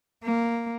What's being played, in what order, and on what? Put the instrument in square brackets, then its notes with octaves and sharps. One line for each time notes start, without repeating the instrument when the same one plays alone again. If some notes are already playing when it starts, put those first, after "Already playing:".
[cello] A#3